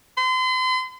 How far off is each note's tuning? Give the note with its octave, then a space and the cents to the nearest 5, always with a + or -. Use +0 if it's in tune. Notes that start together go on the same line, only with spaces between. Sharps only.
C6 -40